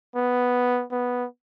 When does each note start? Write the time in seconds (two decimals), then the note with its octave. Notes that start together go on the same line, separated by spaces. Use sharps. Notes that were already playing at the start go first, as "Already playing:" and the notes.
0.15 B3
0.91 B3